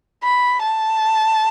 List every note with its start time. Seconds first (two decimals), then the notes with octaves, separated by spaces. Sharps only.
0.23 B5
0.62 A5